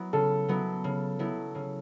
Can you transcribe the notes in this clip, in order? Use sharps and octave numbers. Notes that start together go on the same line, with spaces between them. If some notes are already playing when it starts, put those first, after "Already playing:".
Already playing: F#3 B3 E4
C#3 A4
F#3 B3 E4
C#3
F#3 B3 E4
C#3